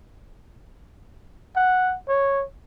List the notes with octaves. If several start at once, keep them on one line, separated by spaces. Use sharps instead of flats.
F#5
C#5